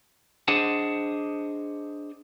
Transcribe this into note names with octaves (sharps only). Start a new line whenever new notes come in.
D4 G#4 C5 D#5 F#5 A5